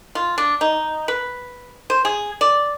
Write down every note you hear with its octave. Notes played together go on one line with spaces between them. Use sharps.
F4
D4
D#4
B4
C5
G#4
D5